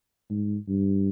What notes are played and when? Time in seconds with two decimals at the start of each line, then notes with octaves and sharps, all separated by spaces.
0.30 G#2
0.69 G2